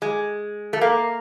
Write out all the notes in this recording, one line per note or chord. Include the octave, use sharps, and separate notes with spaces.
G#3
A3
A#3